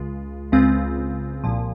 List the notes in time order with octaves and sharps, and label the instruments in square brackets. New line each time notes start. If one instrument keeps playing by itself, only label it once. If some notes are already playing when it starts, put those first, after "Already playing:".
Already playing: [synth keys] C#2 C#3 G#3 F4
C#2 C#3 G#3 C4 F4
C2 A#2 F3